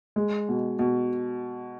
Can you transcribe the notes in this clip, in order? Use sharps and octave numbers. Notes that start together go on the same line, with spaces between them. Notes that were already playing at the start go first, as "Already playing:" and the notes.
G#3
B2
B2